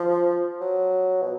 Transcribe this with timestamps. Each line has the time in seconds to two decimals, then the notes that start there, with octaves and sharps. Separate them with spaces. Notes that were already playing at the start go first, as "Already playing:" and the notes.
Already playing: F3
0.61 F#3
1.22 B2